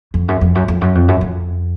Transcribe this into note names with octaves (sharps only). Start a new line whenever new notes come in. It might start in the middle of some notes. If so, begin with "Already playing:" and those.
F2
F#2
F2
F#2
F2
F#2
F2
F#2
F2